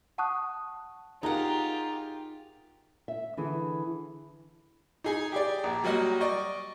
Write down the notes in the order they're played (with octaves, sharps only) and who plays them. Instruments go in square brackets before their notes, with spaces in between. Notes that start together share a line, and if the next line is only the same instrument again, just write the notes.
[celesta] F#5 A5 C#6 D#6 F#6
[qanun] D#4 F#5 [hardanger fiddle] F4 G4 [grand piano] G#4 A#4
[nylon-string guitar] E5
D3 E3 G#4
[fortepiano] D#4 G#4 G#5
G4 G#4 D5
A#1
F#3 G3 A#3 F#4 D#5
D5 D#5 C#6